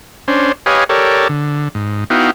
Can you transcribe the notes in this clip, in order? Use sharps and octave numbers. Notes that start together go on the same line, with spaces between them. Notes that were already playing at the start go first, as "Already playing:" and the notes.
C#4 D4 C5
G4 B4 C#5 D#5 F5 G#5
G4 A4 A#4 C#5 D5
D3
G#2
B3 D#4 E4 F#4 F5 G5